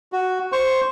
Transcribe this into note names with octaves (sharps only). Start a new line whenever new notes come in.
F#4
C5 C#6